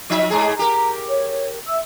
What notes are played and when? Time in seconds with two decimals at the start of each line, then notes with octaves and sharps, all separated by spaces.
0.10 F3 D#4 E5
0.30 G#2 G#3 G#4 A#5
0.59 G4 A#4
1.08 C#5
1.67 E5 E6